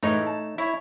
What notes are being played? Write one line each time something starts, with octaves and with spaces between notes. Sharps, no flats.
A2 E3 G#3 A3 D#4 C#5
A5
E4 C#5